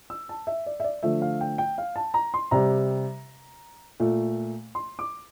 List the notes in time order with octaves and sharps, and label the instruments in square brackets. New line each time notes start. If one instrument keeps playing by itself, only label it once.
[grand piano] E6
A5
E5
D5
E5
D5
D3 F3 A3 E5
F5
G5
G5
F5
A5
A#5
C6
C3 G3 A#5
A#2 A3
C6
D6